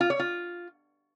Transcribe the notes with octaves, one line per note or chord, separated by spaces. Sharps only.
F4
C#5
F4